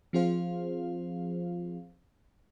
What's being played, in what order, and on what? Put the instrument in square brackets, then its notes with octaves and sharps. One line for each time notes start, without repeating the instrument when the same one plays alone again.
[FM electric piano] F3 C4 F4 G#4 C5 F5